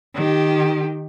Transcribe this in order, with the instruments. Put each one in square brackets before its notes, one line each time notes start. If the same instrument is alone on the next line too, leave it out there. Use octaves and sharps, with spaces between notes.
[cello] D#3 G4